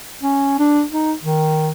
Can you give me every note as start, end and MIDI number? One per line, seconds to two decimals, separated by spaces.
0.23 0.55 61
0.59 0.83 62
0.92 1.13 63
1.24 1.71 51